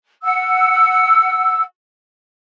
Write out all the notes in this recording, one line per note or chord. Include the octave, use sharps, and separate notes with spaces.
F#5 E6